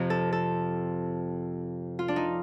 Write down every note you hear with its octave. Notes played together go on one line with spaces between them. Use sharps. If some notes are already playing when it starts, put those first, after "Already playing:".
Already playing: F2 C3 F3
A4
A4
F4
D4
D#4